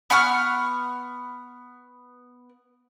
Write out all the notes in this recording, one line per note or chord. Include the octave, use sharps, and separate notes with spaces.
B3 F#5 C#6 F6